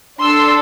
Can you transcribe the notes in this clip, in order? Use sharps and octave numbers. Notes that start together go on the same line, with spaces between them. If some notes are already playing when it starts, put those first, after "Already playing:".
D4 A4 C6 E6